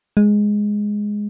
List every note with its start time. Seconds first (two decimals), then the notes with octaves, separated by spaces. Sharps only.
0.17 G#3